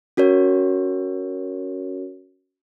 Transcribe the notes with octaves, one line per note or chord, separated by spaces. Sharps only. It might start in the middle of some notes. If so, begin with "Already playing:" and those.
C#4 F#4 A#4 C#5